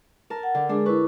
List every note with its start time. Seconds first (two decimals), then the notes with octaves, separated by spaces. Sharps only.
0.30 A#4 A5
0.43 F#5
0.55 D3
0.69 G#3 D4 G#4
0.86 E4 B4 C#6